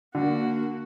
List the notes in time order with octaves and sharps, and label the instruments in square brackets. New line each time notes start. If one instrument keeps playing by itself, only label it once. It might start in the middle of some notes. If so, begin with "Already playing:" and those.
[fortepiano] D3 [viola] A#3 F#4